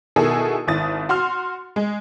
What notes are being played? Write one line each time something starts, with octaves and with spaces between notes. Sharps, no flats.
B2 D#3 E4 G#4 A4
G#1 E4 D#6 A6
F#4 C6 F6
G#3